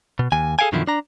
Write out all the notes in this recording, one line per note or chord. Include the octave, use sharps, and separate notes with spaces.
B2
D#2 G#5
G#4 A4 F5 G5 G#5
F#2 B2 D3 D#3 F3 E4
D4 A#5